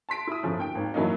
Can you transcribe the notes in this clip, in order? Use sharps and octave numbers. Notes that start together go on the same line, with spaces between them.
A5 C6 B6 D7
E4 D#6
G1 F3 C#4
D#2 G5 D7
G#1 D#2
G2 E3 F#3 A#3 C#4 D#4